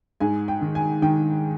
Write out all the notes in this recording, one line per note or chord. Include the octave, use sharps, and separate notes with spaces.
G#2 G#5
G5
D#3
G#5
D#3 G5